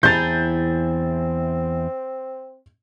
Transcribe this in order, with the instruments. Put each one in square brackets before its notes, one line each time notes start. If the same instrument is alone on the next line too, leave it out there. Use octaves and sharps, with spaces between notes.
[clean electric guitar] E2 A5 A#5 [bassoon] C4 [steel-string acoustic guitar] E4 G#4 [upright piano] G6 A6